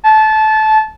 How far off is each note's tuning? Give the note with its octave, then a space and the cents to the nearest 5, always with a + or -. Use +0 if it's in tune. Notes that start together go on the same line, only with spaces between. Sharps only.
A5 -20